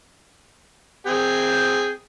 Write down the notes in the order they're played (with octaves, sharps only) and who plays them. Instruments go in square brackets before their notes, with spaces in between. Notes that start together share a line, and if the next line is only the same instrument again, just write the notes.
[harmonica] C4 G#4 G5